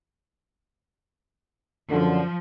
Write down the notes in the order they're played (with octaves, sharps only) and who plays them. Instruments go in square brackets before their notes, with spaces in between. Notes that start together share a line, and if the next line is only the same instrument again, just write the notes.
[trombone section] F#2 D3 [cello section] F3